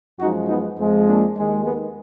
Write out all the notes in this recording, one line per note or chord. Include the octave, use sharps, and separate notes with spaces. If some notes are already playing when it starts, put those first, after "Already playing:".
F#2 F3 G#3 D#4 F#4
B3 D#4
F2 F3 G#3
A#3 D4
D#2 D#3 G#3
G#3 B3